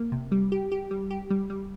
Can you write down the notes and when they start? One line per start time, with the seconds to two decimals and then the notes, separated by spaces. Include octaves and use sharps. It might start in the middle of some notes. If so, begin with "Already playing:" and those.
Already playing: A#3
0.12 C3
0.32 G3
0.52 G4
0.72 G4
0.91 G3
1.10 G4
1.30 G3
1.50 G3